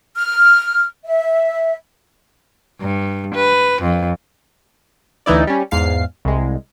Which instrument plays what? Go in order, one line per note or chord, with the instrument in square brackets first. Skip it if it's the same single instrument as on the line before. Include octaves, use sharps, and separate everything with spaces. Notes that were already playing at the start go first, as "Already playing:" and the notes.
[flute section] F6
E5
[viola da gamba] G2
B4
F2
[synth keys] D2 E3 D#4 E4 D5
G3 C#4
E2 G#2 F5 C7
C2 G#3